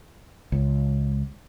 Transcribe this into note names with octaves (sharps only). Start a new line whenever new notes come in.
C#2